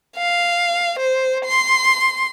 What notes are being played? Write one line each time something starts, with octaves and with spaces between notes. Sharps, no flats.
F5
C5
C6